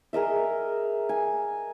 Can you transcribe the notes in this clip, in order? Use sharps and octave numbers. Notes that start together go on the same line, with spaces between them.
G#4 A#4 D#5 E5
G#5